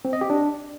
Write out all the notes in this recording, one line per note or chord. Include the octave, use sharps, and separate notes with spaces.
C4
D#5
G4
D4